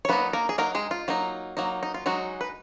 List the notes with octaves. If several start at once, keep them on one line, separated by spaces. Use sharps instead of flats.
C#5
F#3 A#3 B3 D#4 B4
A#3 A#4
G#4
F#3 A#3 D#4 A#4
G#3 G#4
F4
F#3 A#3 D#4
F#3 A#3 D#4
D#4
F4
F#3 G#3 D#4 F#4
B4